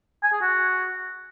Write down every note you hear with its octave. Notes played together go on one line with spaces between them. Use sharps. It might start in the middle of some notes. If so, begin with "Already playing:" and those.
G#5
G#4
F#4